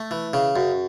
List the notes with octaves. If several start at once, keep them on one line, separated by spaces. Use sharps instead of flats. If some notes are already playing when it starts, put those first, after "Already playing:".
Already playing: A3
E3
C#3
F#2